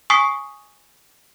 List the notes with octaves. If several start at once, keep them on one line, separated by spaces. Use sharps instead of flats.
G#5 C#6 D#6 B6 C7